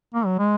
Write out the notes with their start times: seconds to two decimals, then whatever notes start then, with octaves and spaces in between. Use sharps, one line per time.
0.14 A#3
0.26 F#3
0.38 G#3